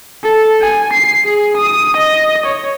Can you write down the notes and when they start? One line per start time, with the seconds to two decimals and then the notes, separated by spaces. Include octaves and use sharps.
0.24 A4
0.61 G#5
0.93 C7
1.25 G#4
1.57 D#6
1.97 D#5
2.46 C#5